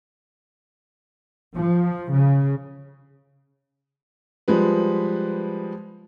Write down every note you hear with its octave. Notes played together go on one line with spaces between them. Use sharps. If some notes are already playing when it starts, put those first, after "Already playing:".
F3
C#3
F3 G3 G#3 B4